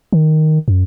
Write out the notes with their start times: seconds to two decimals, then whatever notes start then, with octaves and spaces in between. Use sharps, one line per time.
0.13 D#3
0.68 F#2